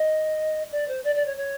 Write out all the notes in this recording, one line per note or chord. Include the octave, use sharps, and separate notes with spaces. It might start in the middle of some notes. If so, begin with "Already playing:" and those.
Already playing: D#5
D5
C5
D5
D5
C#5
C#5